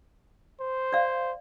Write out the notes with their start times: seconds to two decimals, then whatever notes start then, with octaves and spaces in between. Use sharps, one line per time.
0.60 C5
0.93 D5 F5